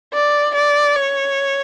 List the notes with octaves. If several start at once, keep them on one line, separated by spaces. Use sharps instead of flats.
D5
D5
C#5